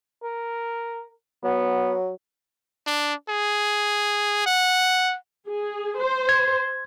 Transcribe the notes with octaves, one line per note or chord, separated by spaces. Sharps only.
A#4
F#3 B3
D4
G#4
F#5
G#4
C5
G#6